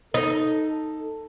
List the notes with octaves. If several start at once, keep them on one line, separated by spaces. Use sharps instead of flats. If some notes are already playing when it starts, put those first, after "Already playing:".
D#4 A4